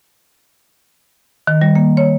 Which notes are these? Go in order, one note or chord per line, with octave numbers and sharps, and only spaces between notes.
D#3
G3
A#3
C#5